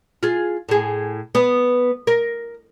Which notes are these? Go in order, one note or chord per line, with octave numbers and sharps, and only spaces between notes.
F4 G#4
A2 G#4
B3
A#4